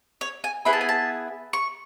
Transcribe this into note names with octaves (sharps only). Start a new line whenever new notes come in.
C#5
G#5
B3 E4 G#4 B5
A5
G#5
A5
C#6